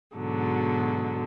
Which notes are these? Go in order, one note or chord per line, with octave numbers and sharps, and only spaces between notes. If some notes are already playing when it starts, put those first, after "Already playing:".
G#2 B2 D3 F#3